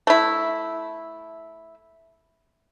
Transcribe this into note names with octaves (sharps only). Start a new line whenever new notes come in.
A3 E4